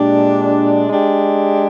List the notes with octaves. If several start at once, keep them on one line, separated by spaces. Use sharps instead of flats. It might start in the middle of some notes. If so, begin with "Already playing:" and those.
Already playing: A#2 G#3 D4 G4
G#3 D4 G4